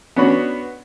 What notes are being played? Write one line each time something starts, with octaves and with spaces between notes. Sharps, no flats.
B3 C#4 D4 F#4 B5